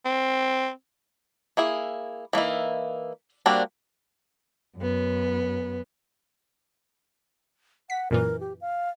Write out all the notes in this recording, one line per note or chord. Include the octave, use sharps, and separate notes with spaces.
C4
A#3 E4 G#4
E3 A#3 D#4 E4
G3 A#3 C4 D4 F#4
F#2 B3
F#5 B6
F#2 A#2 E3 A#4
G4
F5